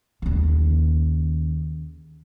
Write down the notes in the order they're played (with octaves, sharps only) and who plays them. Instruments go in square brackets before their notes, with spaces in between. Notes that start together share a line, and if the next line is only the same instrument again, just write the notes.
[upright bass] D#2 C#3